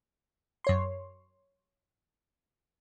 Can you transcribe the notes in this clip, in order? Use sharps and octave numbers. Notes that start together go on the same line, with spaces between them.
F#2 C#5 C6